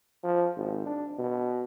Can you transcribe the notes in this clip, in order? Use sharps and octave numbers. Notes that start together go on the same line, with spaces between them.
F3
G#1
D4
B2